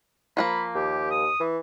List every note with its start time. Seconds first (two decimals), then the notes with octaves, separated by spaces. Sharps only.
0.37 F3 G#3 A#3 B5
0.75 D#2 G4
1.11 D#6
1.40 E3